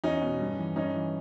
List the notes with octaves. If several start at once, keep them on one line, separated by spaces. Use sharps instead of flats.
E2 C#4 D#4
B2
G2
E3
G2 C#4 D#4
E3